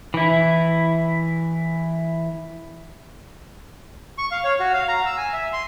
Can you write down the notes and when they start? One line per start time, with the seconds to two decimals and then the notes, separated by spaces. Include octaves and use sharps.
0.14 E3 E4
4.18 C#6
4.31 F5
4.44 C#5
4.60 F#4
4.74 F5
4.88 A#5
5.06 E6
5.18 G#5
5.33 E5
5.53 C6